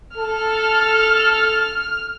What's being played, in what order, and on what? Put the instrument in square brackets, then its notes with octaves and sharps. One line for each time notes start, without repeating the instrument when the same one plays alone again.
[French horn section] A4 [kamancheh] F6